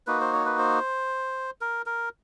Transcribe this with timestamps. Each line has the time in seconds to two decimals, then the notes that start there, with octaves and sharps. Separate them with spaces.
0.07 A#3 D#4 F#4 B4
0.21 C5
0.33 C#5
0.46 B4
0.58 C5
1.61 A#4
1.86 A#4